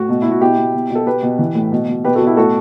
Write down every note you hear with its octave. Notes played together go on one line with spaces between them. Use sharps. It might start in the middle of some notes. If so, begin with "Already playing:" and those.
Already playing: A2 F#4
B2
B2 E4
F#4
B2 E4 G4
B2
B2
B2 A4
B2 G4 B4
B2
E3
A2
B2
B2
B2 G4 B4
F#4 A4
B2
E4 G4
A2 F#4 A4